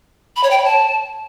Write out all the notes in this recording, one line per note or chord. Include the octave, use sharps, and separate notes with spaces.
B5
C#5
G5
C#5
A5